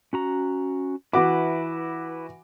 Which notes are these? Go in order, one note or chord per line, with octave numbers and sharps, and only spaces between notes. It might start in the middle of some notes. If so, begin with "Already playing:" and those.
C#4 F#4 A#5
E3 E4 F#4 B4 D6